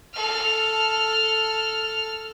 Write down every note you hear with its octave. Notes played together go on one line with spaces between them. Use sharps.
A4 F6